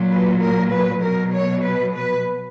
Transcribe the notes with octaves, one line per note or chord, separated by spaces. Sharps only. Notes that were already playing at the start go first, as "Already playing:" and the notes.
Already playing: A#2 F#3
B4
A#4
B4
B2 F#3 A#4
C#5
B4
B4